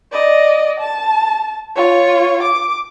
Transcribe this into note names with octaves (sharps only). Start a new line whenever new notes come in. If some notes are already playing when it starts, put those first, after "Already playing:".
D5 D#5
A5
F4 C#5
D6